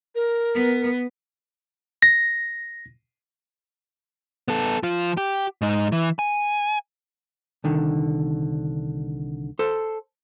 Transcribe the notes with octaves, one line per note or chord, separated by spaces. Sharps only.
A#4
B3
A#6
B3 A4
F3 F4
G4
G#2 D#4
E3
G#5
C2 D3 D#3
A4 C5